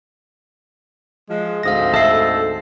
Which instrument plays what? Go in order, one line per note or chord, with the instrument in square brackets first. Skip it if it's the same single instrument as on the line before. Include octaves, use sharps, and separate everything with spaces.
[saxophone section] F3 G#3
[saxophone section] D2 G#2 C4 [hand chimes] F5 D#6 A#6
[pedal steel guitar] A4 E6 [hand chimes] E5 C7